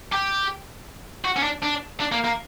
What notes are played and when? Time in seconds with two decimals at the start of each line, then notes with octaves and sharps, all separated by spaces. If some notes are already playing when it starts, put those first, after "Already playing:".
0.12 G4
1.25 F#4
1.36 C#4
1.43 D4
1.62 D4
2.00 D4
2.12 A#3
2.24 A#3